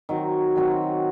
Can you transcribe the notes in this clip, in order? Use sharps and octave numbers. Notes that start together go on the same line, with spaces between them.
D#3 F#3 C4 F#4
D#3 F#3 C4 F#4